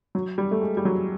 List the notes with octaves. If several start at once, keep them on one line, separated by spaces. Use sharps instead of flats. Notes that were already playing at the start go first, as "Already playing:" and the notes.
F#3
G3
A3
G#3
G3
F#3